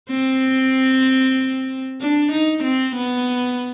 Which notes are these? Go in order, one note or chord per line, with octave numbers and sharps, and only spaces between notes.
C4
D4
D#4
C4
B3